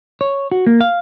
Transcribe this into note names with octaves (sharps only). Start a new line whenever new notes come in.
C#5
F#4
A#3
F5